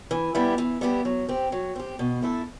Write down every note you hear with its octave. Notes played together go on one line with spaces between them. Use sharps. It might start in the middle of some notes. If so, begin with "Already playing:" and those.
E3
G3 B3 E4 G4
E3
G3 B3 E4 G4
F#3
C4 G4
F#3
C4 G4
B2
A3 E4 A4